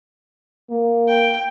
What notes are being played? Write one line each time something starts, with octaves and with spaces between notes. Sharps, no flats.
A#3
G5